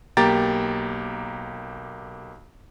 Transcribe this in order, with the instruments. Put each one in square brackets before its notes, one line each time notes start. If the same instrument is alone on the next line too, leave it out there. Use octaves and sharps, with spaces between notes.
[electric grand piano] B1 A#3 G4 A#5 D6 A6